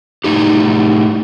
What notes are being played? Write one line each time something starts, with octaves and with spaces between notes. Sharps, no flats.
A2 D#4 G4